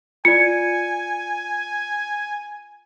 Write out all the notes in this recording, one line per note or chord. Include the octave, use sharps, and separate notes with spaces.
F4 D5 G#5 C#7